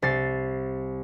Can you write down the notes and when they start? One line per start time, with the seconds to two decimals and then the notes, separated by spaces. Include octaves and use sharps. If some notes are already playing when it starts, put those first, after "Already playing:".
0.02 C2 A6 C7